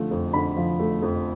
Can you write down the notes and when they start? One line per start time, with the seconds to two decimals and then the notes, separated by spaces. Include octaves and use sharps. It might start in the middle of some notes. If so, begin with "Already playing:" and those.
Already playing: D3 F3 A3
0.11 F2
0.33 D3 B5
0.57 F3
0.79 A3
1.02 F2